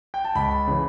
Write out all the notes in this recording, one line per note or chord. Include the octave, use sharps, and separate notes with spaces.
G5
A5
C#2 B5
C#3 E3